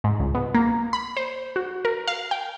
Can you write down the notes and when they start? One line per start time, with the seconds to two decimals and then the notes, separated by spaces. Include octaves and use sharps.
0.04 G#2
0.20 C#2
0.35 B2
0.54 A#3
0.93 B5
1.17 C5
1.56 F#4
1.85 A#4
2.08 F5
2.31 G5